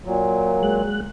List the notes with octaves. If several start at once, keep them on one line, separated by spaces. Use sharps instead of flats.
A#2 F#3
G#3 F#6